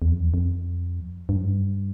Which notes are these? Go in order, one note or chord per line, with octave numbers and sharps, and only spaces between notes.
E2
F2
E2
F2
G2
F#2
G2